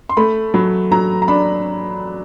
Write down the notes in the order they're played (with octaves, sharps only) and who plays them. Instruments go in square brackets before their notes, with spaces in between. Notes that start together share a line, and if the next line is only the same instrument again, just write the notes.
[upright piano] C6
A3 B5
F#3 B5
F#3 A#5
A#5
D4 B5